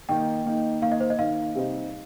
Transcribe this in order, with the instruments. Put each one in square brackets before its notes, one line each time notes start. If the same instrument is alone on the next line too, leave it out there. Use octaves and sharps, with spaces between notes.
[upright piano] D#3 A#3 D#4 [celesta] G5
[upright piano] D#3 A#3 D#4
[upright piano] D#3 A#3 D#4 [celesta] F5
[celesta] D#5
C5
D#5
[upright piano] D#3 A#3 D#4 [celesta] F5
[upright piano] C3 G3 C4 D#4